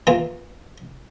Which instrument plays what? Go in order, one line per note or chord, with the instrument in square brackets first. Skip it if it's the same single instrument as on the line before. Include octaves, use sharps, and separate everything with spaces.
[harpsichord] E3 A#3 F4